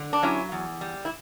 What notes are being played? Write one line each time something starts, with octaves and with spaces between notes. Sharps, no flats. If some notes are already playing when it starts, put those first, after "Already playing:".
Already playing: D3
D4
F#3 C#4 E4
E2
G3
E4